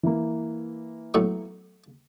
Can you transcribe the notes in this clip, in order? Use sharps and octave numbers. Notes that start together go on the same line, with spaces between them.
E3 A#3
B1 A2 C#6